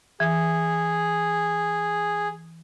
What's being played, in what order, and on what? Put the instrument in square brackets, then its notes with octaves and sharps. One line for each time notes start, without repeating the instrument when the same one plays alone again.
[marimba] E3 [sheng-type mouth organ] G#4